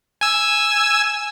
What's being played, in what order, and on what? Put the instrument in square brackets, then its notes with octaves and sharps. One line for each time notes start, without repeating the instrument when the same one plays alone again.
[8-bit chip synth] G#5 E6